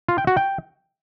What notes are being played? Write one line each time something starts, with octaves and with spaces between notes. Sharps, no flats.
F4
G5
F#4
G5